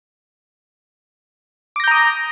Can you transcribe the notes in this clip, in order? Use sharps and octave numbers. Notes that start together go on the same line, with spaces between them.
A#5 D6 D#6 G6 A#6